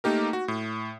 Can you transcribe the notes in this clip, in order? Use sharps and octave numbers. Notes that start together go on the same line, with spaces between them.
A3 A#3 D#4 G4 A#4
F#4
A2